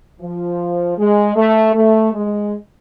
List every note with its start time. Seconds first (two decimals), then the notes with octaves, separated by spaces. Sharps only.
0.21 F3
0.98 G#3
1.36 A3
1.75 A3
2.13 G#3